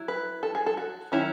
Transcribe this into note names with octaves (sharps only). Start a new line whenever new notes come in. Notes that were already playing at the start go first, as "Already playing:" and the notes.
Already playing: F#3 E4
B4
A4
G#4
A4
F#4
D#3 F#3 C#4 E4